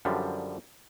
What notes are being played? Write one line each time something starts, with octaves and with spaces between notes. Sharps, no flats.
F#2 D3 F3 G3